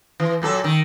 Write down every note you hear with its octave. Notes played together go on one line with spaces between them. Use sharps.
E3
A#2 F#3 A4
D#3